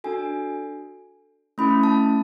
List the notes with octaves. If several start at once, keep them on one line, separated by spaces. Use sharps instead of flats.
D4 F#4 A4 G#5
A3 C#4 E4 B5
A5